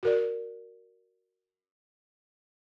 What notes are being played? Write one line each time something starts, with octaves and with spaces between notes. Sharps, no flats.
F#4 A#4 D5